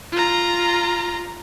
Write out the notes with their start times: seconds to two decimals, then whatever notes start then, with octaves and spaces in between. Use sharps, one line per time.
0.12 F4 A#5